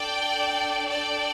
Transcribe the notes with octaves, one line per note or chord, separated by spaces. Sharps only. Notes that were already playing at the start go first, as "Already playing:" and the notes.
Already playing: D4 A4 D5 G5
D5 G5